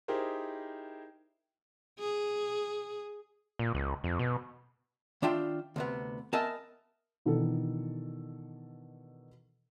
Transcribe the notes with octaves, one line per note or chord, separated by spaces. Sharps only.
D#4 E4 G4 G#4 A#4 C5
G#4
A#2
C#2
F2
B2
D#3 D4 F4 E5 G5
D2 C3 B3
B3 A#4 D#5 E5 G#5 A5
B2 D#3 E3 D4 A4